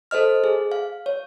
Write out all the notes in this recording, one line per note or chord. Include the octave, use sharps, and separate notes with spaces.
A4 C5 D#5 F6
G#4
F5
C#5